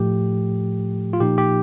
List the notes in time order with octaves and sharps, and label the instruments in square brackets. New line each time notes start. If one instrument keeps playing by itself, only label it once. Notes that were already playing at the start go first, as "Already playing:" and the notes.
Already playing: [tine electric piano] A2 F3 A3 G4
F4
A#2 F3 A#3 D#4 G4
G4